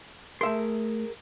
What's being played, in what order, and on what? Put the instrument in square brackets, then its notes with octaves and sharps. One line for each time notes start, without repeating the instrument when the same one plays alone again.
[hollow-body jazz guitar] A3 E5 C6 [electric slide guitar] G#4 A#4